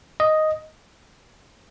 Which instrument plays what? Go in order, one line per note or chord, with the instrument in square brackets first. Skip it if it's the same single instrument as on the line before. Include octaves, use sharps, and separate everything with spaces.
[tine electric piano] D#5